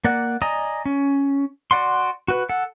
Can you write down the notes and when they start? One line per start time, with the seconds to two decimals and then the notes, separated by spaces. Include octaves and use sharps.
0.04 A#3 D5 F#5
0.42 D5 D#5 G#5 A#5 D#6
0.86 C#4
1.71 F#4 D5 F#5 C6
2.28 F#4 B4
2.49 A4 F#5